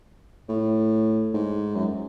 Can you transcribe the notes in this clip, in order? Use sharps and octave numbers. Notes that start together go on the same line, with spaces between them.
A2
G#2
F#2